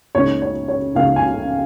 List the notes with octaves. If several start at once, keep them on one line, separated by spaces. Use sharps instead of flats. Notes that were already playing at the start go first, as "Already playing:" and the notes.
C#2 C#3 A#3 D#4 C#5
C#5
C#5
C#2 C#3 A#3 D#4 F5
G#5